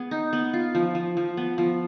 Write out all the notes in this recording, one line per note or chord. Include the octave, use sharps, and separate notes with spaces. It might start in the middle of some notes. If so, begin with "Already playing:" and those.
Already playing: B3 G#4
D#4
B3
F4
F3
F3
F3
B3
F3